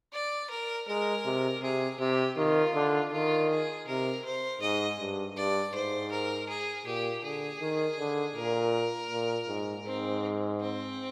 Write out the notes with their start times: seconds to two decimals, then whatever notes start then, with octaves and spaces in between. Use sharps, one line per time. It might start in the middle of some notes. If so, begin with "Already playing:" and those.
0.13 D5
0.50 A#4
0.88 G#3 A#4
1.25 C3
1.62 C3 G#4
1.99 C3 G4
2.37 D#3 F4
2.75 D3
3.12 D#3 F4
3.50 G#4
3.87 C3 A#4
4.25 C5
4.61 G#2 D#5
4.99 G2
5.36 G2 D5
5.74 G#2 C5
6.11 A#4
6.49 G#4
6.86 A#2 G4
7.23 D3 G#4
7.61 D#3
7.99 D3
8.35 A#2 A#4
9.11 A#2
9.48 G#2
9.86 G#2 C4
10.60 C4